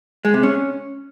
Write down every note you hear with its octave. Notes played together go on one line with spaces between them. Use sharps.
G#3
C3
C#4